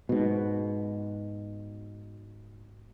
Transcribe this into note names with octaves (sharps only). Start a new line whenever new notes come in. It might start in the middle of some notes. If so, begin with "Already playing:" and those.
G#2 B2